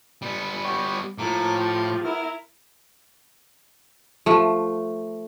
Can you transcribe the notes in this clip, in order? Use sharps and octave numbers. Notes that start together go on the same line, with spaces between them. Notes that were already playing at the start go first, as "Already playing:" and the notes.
G3 B3
F#4 G4 C#5
A2 F3 A#3 D6
G4 F5
B3 E4 A#4 F6
F3 A3